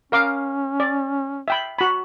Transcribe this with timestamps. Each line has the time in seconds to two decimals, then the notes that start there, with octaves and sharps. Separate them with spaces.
0.12 C#4 A#4 F5 D6
0.80 D5
1.48 E5 G5 B5
1.79 F#4 B5